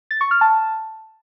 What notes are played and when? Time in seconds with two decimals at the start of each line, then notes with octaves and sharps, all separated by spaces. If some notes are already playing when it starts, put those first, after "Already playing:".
0.11 A6
0.21 C#6
0.31 F6
0.41 A5